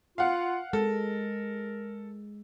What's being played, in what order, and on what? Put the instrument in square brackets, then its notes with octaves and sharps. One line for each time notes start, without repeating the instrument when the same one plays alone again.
[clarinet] F4 [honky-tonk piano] F5 F#5
[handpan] G#3 [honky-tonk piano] A4 [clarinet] A#4